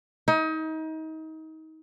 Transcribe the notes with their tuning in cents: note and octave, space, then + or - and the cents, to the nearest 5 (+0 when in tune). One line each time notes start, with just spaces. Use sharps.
D#4 +30